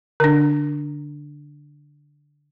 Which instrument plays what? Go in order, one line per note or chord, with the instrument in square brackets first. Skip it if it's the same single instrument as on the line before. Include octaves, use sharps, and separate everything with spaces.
[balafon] D3 D4